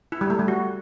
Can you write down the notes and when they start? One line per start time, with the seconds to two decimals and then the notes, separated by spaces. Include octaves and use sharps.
0.12 E4
0.21 G3
0.30 A3
0.39 G3
0.48 F#4